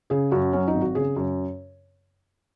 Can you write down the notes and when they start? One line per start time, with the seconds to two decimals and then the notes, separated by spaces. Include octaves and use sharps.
0.10 C#3 G#4
0.31 F#2 F#4
0.53 F#3 C#4
0.68 D#4
0.74 G#1
0.82 F#4
0.95 C#3 G#4
1.16 F#2